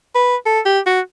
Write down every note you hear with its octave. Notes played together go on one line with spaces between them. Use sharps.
B4
A4
G4
F#4